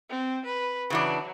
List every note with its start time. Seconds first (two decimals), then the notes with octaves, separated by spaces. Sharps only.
0.10 C4
0.45 B4
0.90 C#3 E3 F#3 D4